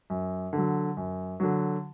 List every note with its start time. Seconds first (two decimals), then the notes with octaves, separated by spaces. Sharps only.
0.10 F#2
0.53 D3 F#3
0.97 F#2
1.40 D3 F#3